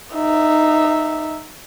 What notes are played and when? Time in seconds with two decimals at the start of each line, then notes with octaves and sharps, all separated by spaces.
0.14 D#4 E5